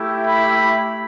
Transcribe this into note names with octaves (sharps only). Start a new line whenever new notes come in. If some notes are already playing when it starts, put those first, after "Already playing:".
Already playing: A3 E4 G4
B5